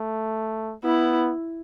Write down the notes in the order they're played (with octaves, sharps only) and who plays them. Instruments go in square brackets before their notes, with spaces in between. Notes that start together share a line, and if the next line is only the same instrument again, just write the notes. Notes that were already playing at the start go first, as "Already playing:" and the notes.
Already playing: [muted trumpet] A3
[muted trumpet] B3 [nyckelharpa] E4